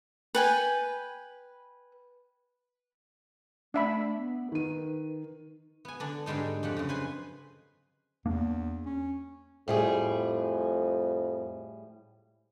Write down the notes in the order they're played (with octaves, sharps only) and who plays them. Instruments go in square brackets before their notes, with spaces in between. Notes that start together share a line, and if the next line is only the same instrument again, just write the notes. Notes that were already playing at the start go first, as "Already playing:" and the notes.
[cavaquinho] B4 G5 G#5
[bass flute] A3 [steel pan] D4 E5 B5
[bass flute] B3
[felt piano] D#3 D#7 [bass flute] B4
[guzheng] B3 G#5
D3 D4
G#2 D3 G3 G#3 D#4
F2 A#3 G4 F#5
F#2 C#3
B4 C5 G#5
[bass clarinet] E2 [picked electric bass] A#3 D4
[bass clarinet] C#4
[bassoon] F2 [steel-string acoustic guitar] A2 G3 G#4